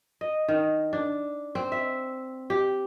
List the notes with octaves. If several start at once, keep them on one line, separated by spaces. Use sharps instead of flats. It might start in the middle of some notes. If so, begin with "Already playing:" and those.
D#5
D#3
D4
C4
E5
G4